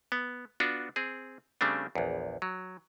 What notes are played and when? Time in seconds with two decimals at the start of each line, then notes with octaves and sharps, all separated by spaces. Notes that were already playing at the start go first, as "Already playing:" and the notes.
0.12 B3
0.60 B3 D4 F4 F#4
0.96 C4 G#4
1.61 C#3 G3 A3 C4 D4
1.95 A#1 E2
2.42 F#3